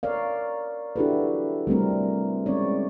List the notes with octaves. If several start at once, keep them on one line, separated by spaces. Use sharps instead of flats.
A#4 C#5 D5 F5
D4 E4 F#4 G4 A4 B4
G3 A3 C4 A#4
G#3 C4 C#4 C#5 D5